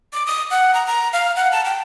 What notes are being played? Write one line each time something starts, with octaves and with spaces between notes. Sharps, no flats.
D6
D#6
F#5
A#5
A#5
F5
F#5
A5
G5